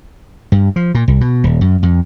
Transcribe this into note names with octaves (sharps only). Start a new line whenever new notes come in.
G2
F3
A#2
C2
B2
D#1
F#2
F2